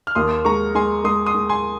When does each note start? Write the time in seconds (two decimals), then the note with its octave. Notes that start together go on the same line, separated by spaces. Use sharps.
0.07 F6
0.15 D#2 C6 D#6
0.45 G#3 A#5 C#6
0.75 G#3 G#5 C6
1.04 G#3 C6 D#6
1.26 C6 D#6
1.34 G#3
1.49 G#5 C6